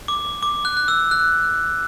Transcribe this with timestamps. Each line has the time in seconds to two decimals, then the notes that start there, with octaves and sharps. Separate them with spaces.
0.08 D6
0.43 D6
0.65 F#6
0.77 F#6
0.88 E6
1.11 F#6